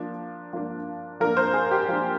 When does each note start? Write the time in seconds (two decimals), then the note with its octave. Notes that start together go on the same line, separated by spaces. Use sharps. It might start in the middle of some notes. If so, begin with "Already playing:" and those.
Already playing: F3 A#3 D4
0.53 F3 A#3 D4
1.20 F3 A#3 D4 A#4
1.37 C5
1.54 G#4
1.71 G4
1.88 F3 A#3 D4